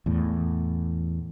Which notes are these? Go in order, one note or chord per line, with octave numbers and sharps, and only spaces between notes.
E2 A2